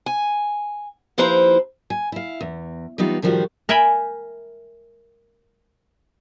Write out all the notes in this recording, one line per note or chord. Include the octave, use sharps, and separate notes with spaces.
G#5
D#2 F3 E4 B4 C5 A#5
G#5
E4 F5
E2
E3 G3 B3 D#4 F4
A2 D#3 F3 G3 F4 F#4
A#4 E5 G5 G#5 B5